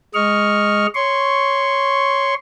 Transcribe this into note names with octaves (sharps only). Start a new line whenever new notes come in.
G#3 D#5 C#6 F6
C#5 C6 C#6